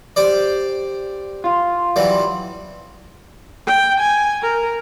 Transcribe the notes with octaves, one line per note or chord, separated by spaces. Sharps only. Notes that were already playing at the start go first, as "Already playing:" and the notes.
G4 C5 D5
F4
E3 F#3 G3
G5
G#5
A#4